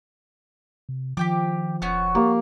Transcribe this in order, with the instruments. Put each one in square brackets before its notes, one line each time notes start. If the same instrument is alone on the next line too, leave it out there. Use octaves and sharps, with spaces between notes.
[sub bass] C3
[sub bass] D#3 [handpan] F3 [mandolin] G4 G5 D6
[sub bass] E1 [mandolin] B3 C#4 F#4
[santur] A#3 [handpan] G4